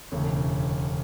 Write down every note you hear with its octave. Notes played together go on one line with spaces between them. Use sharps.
E1 D2 C#3 C#5